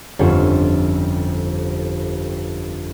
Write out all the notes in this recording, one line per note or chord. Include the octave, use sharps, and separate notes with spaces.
G1 F2 C4 C#4 F4